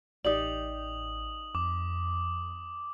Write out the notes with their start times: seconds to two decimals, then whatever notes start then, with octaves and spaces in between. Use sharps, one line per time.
0.25 A1 D#4 G4 D5 D#6 F#7
1.55 F2 D6